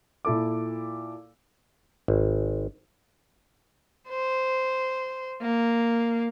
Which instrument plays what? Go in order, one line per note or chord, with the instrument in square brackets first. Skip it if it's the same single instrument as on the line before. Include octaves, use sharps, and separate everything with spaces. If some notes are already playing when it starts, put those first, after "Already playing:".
[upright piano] A#2 E4 A4 D6
[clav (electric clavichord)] G#1
[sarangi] C5
A#3